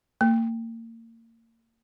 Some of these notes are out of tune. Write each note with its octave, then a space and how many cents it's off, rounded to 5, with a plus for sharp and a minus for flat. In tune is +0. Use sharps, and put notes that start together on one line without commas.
A#3 -35